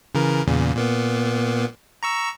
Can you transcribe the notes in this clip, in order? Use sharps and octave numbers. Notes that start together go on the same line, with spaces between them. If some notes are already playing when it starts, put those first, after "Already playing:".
C#3 E3 A#4
E2 A#2 C#3
A#2 A#3 B3
A#5 C#6 E6